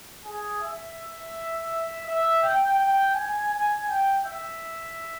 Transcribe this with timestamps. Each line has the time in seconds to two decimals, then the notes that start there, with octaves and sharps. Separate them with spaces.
0.25 G#4
0.62 E5
2.06 E5
2.43 G5
2.79 G5
3.15 G#5
3.52 G#5
3.89 G5
4.25 E5